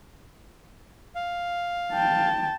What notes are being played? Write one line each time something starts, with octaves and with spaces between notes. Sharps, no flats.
F5
G5 A5